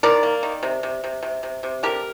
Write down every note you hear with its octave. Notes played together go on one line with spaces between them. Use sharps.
D#3 A#4 D5
A#3
D#3
C3
C3
C3
C3
C3
C3
D3 G4 A#4